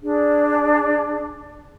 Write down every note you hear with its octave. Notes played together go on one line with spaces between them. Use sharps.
D4 G#4